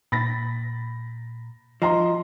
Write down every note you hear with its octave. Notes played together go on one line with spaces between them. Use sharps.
A#2 B5 A6 A#6
F3 D#5 A#5 C6